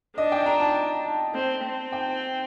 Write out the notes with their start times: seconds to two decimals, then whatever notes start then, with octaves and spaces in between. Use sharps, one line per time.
0.17 D4 D#5
0.32 G5
0.46 A#5
0.61 A5
1.34 C4
1.64 C4
1.92 G5